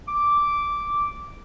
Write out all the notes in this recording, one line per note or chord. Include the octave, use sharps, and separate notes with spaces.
D6